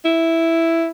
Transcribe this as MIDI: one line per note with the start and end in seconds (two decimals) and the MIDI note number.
0.05 0.90 64